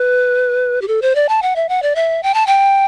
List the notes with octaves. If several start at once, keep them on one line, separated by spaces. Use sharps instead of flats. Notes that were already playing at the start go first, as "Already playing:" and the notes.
Already playing: B4
G4
A4
C5
D5
A5
F#5
E5
F#5
D5
E5
G5
A5
G5